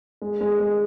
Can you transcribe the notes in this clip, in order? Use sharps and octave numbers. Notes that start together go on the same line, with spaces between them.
G#3
G#3
G#3